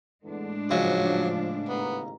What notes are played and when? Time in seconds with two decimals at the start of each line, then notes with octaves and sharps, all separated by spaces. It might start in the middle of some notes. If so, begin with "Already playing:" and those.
0.24 E2 A2 D3 G#3 D4
0.71 G#2 C#3 F3 F#3
1.69 A1 D#3 B3 A#5